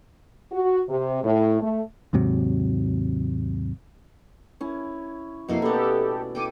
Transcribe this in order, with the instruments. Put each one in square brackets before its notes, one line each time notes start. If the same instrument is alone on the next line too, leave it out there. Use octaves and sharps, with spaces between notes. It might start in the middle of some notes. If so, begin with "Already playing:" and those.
[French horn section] F#4
C3
A2
A3
[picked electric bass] D#2 G#2 C3 F#3
[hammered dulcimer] C#4 E4
[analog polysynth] F2 E4 C7 [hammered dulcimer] B2 [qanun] A3 A#3 A4
[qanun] B3 C#4 [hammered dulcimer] E4 D5 [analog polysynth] G4 A4
[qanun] E4 A4 G5 [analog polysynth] D6 D#7